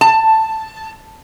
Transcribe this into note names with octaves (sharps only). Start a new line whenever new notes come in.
A5